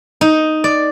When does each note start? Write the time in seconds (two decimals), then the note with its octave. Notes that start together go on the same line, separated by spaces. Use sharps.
0.21 D#4
0.64 D5